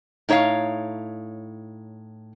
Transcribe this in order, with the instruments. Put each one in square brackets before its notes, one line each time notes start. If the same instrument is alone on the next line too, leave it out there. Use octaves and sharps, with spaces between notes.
[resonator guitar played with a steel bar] A2 D#4 C#5 E5 F5